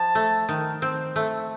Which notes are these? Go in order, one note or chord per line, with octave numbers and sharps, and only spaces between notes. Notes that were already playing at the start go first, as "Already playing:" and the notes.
Already playing: F3 A5
A3
D#3
C4
A3